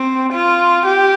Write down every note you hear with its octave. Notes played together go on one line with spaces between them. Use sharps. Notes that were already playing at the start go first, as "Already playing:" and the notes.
Already playing: C4
F4
G4